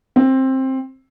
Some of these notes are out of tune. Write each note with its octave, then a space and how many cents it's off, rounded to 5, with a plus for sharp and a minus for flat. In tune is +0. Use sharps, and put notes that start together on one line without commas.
C4 +15